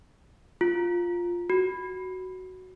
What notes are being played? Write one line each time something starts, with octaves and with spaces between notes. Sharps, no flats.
F4
F#4